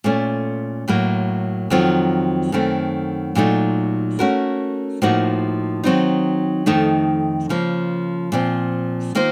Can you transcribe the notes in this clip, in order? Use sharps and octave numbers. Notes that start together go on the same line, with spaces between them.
A#2 A3 C#4
A2 F#3 A#3
F2 D#3 F#3 C4 F4
F#2 D#3 A3 C4
A#2 F#3 A3 D#4
A3 C#4 F#4 A#4
A2 F3 A#3 D#4 F#4
D#3 F#3 C4 D#4
F2 D#3 A3 D#4
C#3 F3 A#3
A#2 F3 C4
D#3 A#3 F4 C5